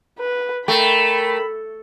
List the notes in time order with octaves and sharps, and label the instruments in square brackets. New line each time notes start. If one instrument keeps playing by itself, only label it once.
[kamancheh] B4
[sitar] A3 [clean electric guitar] A#4 G5 [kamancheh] B5